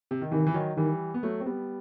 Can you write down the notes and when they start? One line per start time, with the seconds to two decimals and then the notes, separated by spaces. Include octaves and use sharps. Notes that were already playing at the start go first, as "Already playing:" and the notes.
0.11 C3
0.21 D#3
0.32 C3 D#3 E3
0.47 E3
0.54 D#3 F#3
0.77 D#3 E3 G3
1.14 B3
1.23 F#3 A3
1.40 C4
1.46 G3 B3